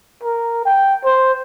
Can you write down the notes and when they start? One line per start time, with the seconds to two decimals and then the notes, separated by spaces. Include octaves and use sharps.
0.23 A#4
0.65 G5
1.04 C5